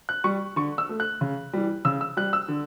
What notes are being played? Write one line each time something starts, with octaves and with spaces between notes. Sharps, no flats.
F#6
G3 C#6
D3 C#6
E6
A3
F#6
C#3
E3 G3
C#3 E6
E6
G3 F#6
E6
D3